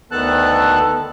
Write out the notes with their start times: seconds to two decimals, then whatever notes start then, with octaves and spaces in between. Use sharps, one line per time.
0.11 D2 D#3 B3 A4 A5 F#6